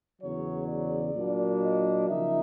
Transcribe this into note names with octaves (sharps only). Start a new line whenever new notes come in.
E2 C#3 F#3 C#5
D5
A#2 F#3 A#3 D4
D#5
C#3 F3 A#3 D#4 E5